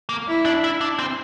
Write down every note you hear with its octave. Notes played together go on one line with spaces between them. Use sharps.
A#3
E4
D4
E4
D4
C4